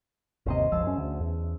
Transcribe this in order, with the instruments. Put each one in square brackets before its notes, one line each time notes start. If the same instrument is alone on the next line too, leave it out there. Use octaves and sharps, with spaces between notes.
[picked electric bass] G1 D#2 C3 [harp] C#4 C5 D#5
[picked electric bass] G1 C#2 F3 [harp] G#4 A5 E6
[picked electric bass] F#2 C#4
D2
E2